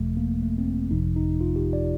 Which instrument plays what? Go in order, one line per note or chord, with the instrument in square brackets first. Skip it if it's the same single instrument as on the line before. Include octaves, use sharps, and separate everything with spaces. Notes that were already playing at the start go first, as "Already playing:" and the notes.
Already playing: [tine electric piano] G1 F2 C3 F3 A3
A#3
A3
C4
G1 F2 C3 F3 D#4
D#4
F4
G4
D5